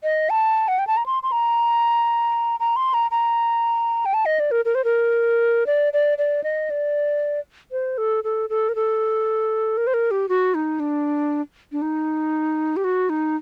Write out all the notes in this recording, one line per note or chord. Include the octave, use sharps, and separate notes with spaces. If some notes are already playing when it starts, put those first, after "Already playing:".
D#5
A5
F#5
G5
A5
A#5
C6
C6
A#5
A#5
C6
A#5
A#5
G5
A5
D#5
D5
A#4
A#4
C5
A#4
D5
D5
D5
D#5
D5
C5
A4
A4
A4
A#4
A4
A#4
C5
A#4
G4
F#4
D#4
D4
D4
D#4
G4
F#4
D#4